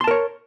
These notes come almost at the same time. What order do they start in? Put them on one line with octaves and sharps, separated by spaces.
C6 A5 A#4 C#5